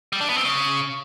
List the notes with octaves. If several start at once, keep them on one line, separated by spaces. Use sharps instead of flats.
G3
D4
B3
C4
C#3